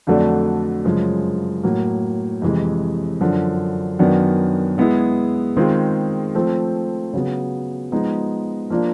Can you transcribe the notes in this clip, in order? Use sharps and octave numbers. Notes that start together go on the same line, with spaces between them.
F2 D3 F#3 A3 D4
F#2 C#3 F3 G#3
A2 F#3 A#3
F2 C3 E3 G#3
F#2 D3 F3
F#2 D#3 F#3 B3 D4
G#3 B3 E4 G#4
D#3 G#3 C4 F4 G#4
F3 A3 C4
C#3 F#3 B3
F3 G#3 B3 D#4
F3 A#3 D4 F4 A#4